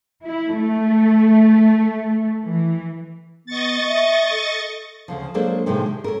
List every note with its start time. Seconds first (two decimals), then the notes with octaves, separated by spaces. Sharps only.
0.25 E4
0.58 A3
2.46 E3
3.46 B3 D#5 C#6 A6
3.87 E5
4.31 A4
5.08 D2 C#3 F3
5.34 F#3 G#3 A#3 D4 A4 C5
5.66 A2 C3 D#3 F3 G#3
5.86 G4
6.04 C#4 A4 A#4